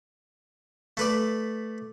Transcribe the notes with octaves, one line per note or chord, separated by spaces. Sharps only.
A3 B4 D5